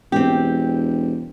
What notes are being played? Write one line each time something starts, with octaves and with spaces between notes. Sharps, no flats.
E1 C4 G4